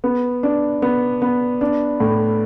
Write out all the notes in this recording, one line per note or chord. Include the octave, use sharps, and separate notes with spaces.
B3
D4
B3
B3
D4
A2